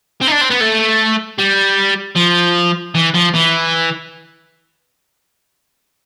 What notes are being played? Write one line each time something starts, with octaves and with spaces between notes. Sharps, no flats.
C4
D#4
D4
C4
B3
A3
G3
F3
E3
F3
E3